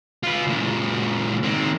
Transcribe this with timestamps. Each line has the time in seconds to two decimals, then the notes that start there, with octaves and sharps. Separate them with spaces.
0.23 F4 B4
0.47 C#2 A#2
1.43 D#3 C4